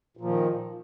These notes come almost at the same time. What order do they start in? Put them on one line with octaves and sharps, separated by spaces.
A#2 F3 D#3